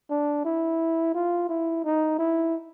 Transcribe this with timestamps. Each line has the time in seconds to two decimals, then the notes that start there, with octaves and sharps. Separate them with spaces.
0.10 D4
0.45 E4
1.14 F4
1.49 E4
1.84 D#4
2.19 E4